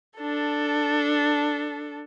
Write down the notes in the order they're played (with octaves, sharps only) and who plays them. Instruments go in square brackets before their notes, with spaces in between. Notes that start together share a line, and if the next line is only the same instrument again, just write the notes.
[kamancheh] D4 A4